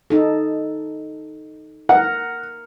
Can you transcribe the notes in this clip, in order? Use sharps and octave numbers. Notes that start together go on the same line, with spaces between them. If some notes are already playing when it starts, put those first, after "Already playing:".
D#4 A4
A#4 F#5